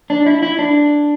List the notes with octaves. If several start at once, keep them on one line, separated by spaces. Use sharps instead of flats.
D4
E4
E4
D4